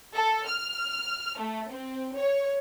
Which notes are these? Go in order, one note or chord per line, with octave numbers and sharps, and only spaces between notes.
A4
F6
A3
C4
C#5